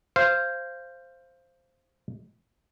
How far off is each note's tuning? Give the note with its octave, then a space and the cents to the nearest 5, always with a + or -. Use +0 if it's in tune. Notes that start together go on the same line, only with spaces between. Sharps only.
C5 +5 F5 -15